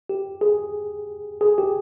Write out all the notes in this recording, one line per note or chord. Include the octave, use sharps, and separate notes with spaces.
G4
G#4
G#4
G4